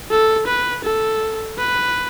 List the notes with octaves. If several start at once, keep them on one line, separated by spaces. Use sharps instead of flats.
A4
B4
A4
B4